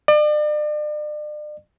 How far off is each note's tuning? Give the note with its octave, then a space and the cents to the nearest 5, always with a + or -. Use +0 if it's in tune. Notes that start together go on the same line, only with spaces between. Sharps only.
D5 +40